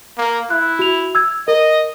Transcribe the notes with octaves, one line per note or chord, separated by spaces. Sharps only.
A#3
E4 F#6
F#4 F7
E6 G#6
A#4 D#5